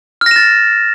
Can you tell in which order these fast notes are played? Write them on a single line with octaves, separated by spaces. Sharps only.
F6 A#6 E7 A6